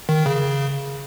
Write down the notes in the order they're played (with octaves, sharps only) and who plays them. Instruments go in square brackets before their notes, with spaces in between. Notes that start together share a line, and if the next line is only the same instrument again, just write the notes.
[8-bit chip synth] D#3
C#3